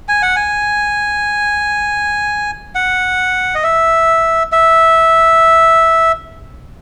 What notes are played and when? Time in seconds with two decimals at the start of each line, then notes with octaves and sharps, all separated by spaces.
0.09 G#5
0.22 F#5
0.36 G#5
2.75 F#5
3.55 D#5
3.63 E5
4.52 E5